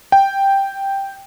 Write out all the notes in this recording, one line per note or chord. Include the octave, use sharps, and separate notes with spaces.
G5